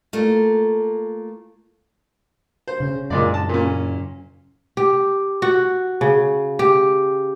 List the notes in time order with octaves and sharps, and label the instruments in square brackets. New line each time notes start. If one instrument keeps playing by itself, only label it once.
[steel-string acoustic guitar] A3 A#3 F4
[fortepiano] C5
[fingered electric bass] C#3 C#4
[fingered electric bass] F#2 C#3 [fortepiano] A#2 G#3 D5
[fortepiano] A5
A#2 C#4
[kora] G4
F#4
C#3
G4